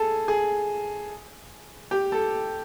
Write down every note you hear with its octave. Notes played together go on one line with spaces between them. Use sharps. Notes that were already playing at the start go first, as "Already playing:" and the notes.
Already playing: G#4 A4
G#4
G4
A4